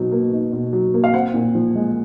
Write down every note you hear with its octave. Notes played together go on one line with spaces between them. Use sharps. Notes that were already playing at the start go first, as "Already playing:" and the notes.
Already playing: B2 F#3 D#4
A#3
D#4
B2
F#3
A#3
F5
C4 F#5
A#2
F3
G#3